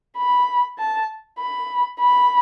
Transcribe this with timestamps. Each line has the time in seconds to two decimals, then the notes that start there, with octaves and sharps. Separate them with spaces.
0.17 B5
0.78 A5
1.39 B5
2.00 B5